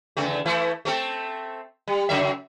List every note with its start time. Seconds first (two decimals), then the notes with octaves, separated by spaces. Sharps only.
0.17 E2 C#3 A3
0.46 E3 A3 E4
0.85 A3 C4 A4
1.88 G3
2.09 C#3 F#3 E5